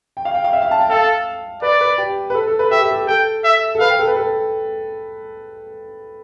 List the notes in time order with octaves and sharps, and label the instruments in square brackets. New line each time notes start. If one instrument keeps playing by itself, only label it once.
[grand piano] G5
F5
G5
F5
E5
F5
A5
G5
[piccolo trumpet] A4 [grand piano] F5
[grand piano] B4 [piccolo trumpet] D5
[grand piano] B4
G4
B4
A4
A4
B4
[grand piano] G4 [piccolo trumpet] E5
[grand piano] A4
G4
[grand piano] A4 [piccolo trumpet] G5
[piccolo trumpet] E5
[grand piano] A4
[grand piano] B4 [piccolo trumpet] F5
[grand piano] G5
A4
B4
A4